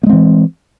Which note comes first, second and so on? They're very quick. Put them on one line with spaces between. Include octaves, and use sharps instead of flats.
A#3 G#3 C4 E3